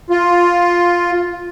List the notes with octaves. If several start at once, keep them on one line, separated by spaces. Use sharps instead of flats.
F4